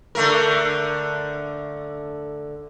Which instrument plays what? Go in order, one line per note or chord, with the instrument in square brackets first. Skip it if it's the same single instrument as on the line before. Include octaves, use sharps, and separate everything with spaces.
[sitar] D3 A3 A#4